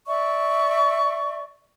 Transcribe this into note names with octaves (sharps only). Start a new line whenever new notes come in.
D5 E5 C#6